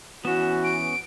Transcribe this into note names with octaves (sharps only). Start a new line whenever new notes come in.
E3 B3 C#4 F#4 E7
D7